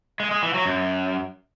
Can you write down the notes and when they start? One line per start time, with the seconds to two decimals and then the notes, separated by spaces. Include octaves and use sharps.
0.20 G#3
0.31 G#3
0.43 E3
0.54 F#3
0.66 F#2